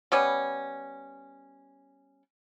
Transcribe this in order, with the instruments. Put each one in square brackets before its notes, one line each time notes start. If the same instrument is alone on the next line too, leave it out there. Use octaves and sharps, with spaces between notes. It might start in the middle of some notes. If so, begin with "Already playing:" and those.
[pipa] G3 B3 C#4